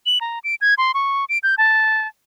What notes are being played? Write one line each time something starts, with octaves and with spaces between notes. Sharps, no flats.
F#7
A#5
D7
G#6
C6
C#6
D7
G6
A5